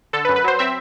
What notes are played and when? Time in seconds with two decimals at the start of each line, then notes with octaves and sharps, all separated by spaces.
0.13 D3 A4
0.25 B4
0.29 F#2
0.36 B4
0.44 F#3 C5
0.59 C4 E5